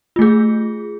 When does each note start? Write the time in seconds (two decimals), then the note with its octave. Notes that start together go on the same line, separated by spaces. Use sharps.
0.16 F4
0.19 A3
0.22 G#4